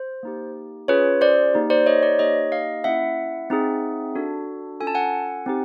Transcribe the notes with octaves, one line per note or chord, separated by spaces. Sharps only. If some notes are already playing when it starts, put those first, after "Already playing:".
Already playing: C5
A#3 D#4 G4
C#4 F4 G#4 B4 C#5
C5 D5
A#3 D#4 G4
C5 D5
C#5 D#5
C5 D5
A#3 D#4 G4 C#5 D#5
D#5 F5
A#3 C#4 E4 E5 F#5
C4 D#4 G#4
D4 F#4 A4
C#4 F4 A4 G#5
A5
F#5 G#5
C4 D#4 G4